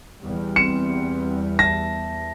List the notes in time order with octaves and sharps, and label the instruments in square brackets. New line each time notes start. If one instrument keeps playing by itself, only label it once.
[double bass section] E2 G3
[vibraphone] C4 [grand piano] C#7
[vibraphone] E5 A5 [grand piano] A#6